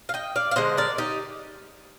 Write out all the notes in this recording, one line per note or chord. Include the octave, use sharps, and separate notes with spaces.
F5
D#5 G5
D5 F5
F5
D3 G#3 C5 D#5
A#4 D5
D#4 G4